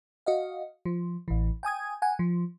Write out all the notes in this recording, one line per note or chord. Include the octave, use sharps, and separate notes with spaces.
F#4 D#5 F5
F3
A1 E3
G5 G#5 D#6 G#6
F#5 G#5
F3